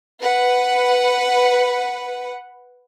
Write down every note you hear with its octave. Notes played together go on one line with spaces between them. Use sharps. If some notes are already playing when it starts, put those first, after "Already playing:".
B4 F#5